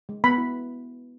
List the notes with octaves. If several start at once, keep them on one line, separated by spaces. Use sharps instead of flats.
G#3
B3 B5
E4